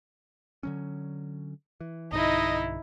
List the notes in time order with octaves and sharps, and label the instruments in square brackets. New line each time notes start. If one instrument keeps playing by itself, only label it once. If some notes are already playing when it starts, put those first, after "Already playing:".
[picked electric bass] D3 F#3 C#4
E3
[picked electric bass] B1 G2 D3 [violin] D#4 E4 [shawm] D#5